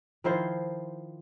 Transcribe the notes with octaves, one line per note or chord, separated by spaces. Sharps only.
D#3 F3 E4 C5